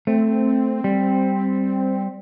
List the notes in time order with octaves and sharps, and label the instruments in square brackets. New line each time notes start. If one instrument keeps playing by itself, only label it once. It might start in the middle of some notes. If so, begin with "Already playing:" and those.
[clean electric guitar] A3 [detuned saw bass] C4
[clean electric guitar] G3